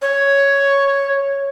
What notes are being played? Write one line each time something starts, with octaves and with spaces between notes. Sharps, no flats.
C#5